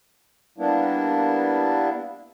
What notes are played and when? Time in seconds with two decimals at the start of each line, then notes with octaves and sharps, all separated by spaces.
0.58 G3 A#3 B3 D4 E4